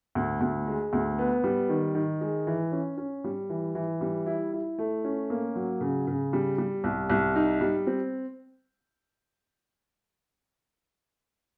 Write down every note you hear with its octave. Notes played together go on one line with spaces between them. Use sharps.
D2
D2
G#3
D2
B3
G3
D#3
D#3
G#3
E3
C#4
C#4
G3
E3
E3
G3
E4
E4
A3
C#4
A#3
F#3
C#3
C#3
G3
G3
C2
C2
D#4
G3
C4